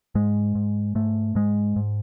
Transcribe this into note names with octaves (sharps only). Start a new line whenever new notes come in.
G#2 G#3
G#2
G#2 A3
G#2 G#3
G#2